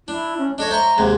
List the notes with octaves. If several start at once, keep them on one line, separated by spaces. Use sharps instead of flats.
D4 E4
C#4
D4 A4 C#5 D#5
C5 E5 A#5 C#6
D#2 G#2 C3